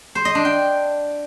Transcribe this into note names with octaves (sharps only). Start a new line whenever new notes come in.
C5
D#5
D4
G5